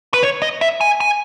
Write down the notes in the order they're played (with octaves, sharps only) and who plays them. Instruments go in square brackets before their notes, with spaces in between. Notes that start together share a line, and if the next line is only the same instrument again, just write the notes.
[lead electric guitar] B4
C#5
D#5
E5
G#5
G#5